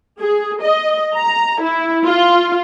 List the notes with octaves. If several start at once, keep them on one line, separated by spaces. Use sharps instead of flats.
G#4
D#5
A#5
E4
F4